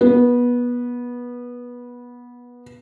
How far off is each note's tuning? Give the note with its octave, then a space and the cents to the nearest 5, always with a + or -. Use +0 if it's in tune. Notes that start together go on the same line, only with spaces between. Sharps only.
B3 -20